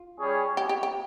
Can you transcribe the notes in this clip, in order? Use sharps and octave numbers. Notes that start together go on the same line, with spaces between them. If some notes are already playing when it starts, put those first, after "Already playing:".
Already playing: F4
G3 C#4 G#4 C#5
G4
G4
G4